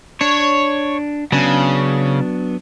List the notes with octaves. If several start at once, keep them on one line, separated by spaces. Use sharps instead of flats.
D4 C#5
C#3 F#3 B3 D4